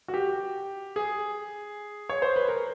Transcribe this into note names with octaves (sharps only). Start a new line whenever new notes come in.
F#4
G4
G#4
C#5
C5
B4
A#4